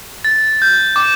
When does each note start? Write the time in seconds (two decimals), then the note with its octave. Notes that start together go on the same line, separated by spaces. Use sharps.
0.24 A6
0.62 G6
0.96 D6